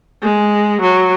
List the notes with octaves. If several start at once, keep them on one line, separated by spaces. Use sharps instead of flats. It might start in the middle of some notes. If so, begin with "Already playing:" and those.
G#3
F#3